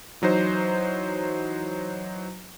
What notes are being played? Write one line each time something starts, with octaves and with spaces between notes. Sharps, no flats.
E3 F#3 D#4 C5